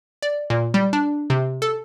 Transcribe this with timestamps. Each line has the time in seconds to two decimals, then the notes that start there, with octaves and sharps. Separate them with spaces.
0.22 D5
0.50 A#2
0.74 G3
0.93 D4
1.30 C3
1.62 A4